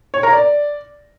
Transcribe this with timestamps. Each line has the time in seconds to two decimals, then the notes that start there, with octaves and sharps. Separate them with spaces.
0.14 C#5
0.23 A#4
0.33 D5